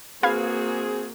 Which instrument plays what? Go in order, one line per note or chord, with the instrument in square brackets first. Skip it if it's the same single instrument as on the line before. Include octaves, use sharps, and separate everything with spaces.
[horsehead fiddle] A#3 F#4 [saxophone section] C4 G#4 [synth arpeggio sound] B4 F5 G#6